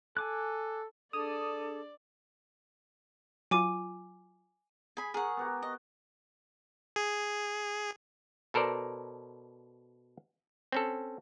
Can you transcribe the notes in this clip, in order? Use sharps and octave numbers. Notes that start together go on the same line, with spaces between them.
A4 G#5 D6 F#6
D4 G#4 A4 D5 D6 D#6
F#3 F4 G#5 D6 D#7
G#4 G#5 B5
G#4 A#4 F#5 C#6
B3 F#4 G4
D#5
G#4
B2 A4 A#4 C5 D5
C4 C#4 A4